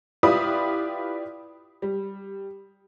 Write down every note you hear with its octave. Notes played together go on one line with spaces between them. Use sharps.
E4 F4 G4 B4 D5 D#6
G3